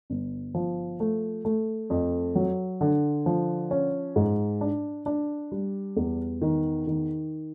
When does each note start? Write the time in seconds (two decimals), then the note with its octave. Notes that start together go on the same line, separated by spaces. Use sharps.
0.10 G1
0.54 F3
1.00 A3
1.45 A3
1.90 F2
2.35 F#3
2.81 D3
3.26 F3
3.71 C#4
4.16 G#2
4.61 D4
5.06 D4
5.52 G3
5.97 E2
6.42 D#3
6.87 D#3